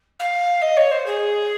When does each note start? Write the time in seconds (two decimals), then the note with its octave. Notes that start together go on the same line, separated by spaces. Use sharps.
0.19 F5
0.61 D#5
0.77 C#5
0.91 C5
1.06 G#4